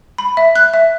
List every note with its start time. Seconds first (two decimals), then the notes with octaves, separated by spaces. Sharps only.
0.18 B5
0.37 E5
0.55 F#6
0.74 E5